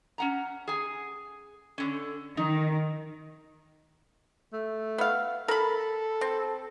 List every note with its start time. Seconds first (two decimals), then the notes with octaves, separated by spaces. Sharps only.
0.18 C#4 F#5 A#5
0.68 G#4 G#5
1.78 D3 C#4
2.37 D#3 D#4
4.52 A3
4.98 B3 F5
5.48 A4 A#4 B5
6.21 C4